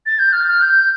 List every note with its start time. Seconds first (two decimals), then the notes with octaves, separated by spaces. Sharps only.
0.06 A6
0.19 G6
0.33 F6
0.48 F6
0.62 G6